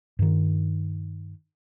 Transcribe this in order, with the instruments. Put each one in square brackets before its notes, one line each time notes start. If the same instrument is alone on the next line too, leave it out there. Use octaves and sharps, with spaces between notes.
[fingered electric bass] G2 D#3